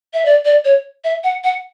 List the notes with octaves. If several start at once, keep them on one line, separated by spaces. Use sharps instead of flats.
E5
D5
D5
C#5
E5
F#5
F#5